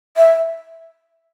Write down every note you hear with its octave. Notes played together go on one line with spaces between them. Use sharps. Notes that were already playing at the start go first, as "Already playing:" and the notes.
E5